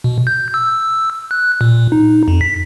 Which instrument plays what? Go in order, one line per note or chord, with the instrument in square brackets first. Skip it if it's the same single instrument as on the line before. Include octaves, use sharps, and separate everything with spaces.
[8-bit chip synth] B2
G6
E6
F#6
A#2
D#4
F2
B6